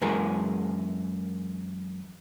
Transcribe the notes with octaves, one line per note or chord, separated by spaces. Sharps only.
F#2 E3 G#3 A#3 G#4 A#4